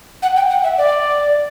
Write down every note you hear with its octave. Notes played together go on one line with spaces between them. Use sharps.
F#5
G5
F#5
E5
D5